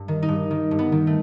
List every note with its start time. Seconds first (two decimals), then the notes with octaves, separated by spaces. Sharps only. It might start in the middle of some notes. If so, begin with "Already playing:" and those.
Already playing: G2
0.08 D#3
0.23 D#4
0.28 G2
0.51 D#3
0.71 G2
0.79 B3
0.92 D#3
1.07 A3